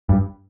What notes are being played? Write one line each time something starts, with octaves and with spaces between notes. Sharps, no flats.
G2